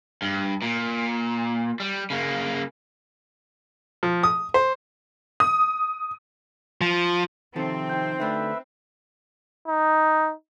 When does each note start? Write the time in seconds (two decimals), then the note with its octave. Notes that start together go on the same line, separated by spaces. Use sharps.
0.22 G2
0.62 A#2
1.80 G3
2.10 C#3 A#3
4.03 F3
4.23 D#6
4.54 C5
5.40 D#6
6.81 F3
7.56 C3 D#3 F3 C4 A4
7.90 D#4 G5 G6
8.20 D3 A3 D4 B4 E5
9.68 D#4